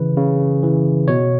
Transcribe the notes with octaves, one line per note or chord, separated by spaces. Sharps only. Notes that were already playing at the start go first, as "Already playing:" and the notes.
Already playing: C#3 E3 B4
C#3
E3
B2 C#5